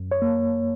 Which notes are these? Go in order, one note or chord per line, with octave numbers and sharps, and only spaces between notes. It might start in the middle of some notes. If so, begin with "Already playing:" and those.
Already playing: F#2
C#5
A#3